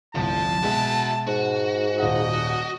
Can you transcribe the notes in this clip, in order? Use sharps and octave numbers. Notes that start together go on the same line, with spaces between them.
G1 C2 A2 F3 A5
B2 G#3 F#4 E5
G#2 F#4
D#1 F4 D#5 F#5